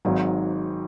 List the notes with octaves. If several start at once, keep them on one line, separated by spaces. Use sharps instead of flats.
G#1 G#2 F#3